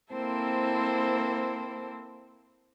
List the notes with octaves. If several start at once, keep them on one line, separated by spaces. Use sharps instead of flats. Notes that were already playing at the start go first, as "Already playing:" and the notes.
A#3 C4 E4 A4 C5